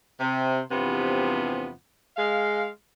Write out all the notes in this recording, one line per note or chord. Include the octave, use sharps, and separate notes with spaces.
C3
E2 G2 C3 F3 B3
G#3 F5